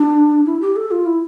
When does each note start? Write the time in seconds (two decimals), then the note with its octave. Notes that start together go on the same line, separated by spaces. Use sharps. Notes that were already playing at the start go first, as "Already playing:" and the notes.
Already playing: D4
0.46 E4
0.61 G4
0.76 A4
0.91 F4
1.06 E4